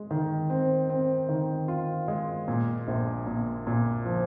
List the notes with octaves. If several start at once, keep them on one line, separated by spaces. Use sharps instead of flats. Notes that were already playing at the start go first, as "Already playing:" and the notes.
Already playing: G#3
D#3
C4
C4
D#3
F4
G#3
A#2
A#1
A#2
A#2
F3